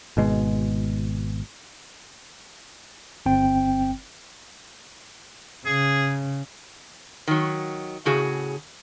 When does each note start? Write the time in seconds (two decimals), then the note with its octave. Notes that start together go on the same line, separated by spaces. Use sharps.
0.17 G#1 B2 G#3
3.26 G1 C4 G5
5.66 C#3 G#4
7.27 D#3 F#3
8.05 A2 C#3 F#4 G#4